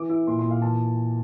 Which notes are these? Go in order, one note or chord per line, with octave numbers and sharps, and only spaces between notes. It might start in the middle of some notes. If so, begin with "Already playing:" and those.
Already playing: E3 D6
E4
A#2 C6
C6
A#2
F5
E3 A5